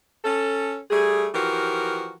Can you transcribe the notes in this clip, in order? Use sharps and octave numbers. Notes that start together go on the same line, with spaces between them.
C#4 A4
G3 A3 G#4
E3 F3 F#4 G4 A#4